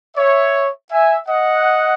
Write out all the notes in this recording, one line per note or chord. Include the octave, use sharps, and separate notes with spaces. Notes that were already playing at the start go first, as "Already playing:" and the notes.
C#5 E5
E5 G#5
D#5 F#5